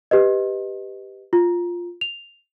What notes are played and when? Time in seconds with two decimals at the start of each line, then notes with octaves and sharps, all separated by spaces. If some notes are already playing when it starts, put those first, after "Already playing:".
0.11 G4 B4 D#5
1.33 F4
2.01 F7